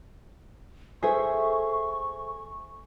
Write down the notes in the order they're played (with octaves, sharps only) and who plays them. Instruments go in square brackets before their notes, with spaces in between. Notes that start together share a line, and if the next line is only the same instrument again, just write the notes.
[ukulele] G#4 [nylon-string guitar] A4 C5 E5 [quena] C#6